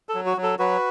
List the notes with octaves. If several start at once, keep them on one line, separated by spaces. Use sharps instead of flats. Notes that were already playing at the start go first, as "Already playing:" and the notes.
A4
F#3
F#4
F#3
A4
F#3 F#4 B4